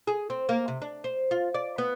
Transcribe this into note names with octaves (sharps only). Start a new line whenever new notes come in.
G#4
C4
A#3
C3
D4
C5
F4
D5
B3